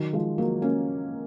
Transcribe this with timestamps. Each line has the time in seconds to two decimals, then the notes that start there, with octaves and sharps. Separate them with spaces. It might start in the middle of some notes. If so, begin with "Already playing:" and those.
Already playing: D#3 F#3
0.13 F3 G#3
0.38 F#3 A#3
0.62 A#3 C#4